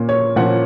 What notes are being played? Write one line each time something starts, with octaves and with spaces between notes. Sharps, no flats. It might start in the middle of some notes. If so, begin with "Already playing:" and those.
Already playing: A#2 A#3 C#4
C#5
A#2 F3 A#3 C#4 F#5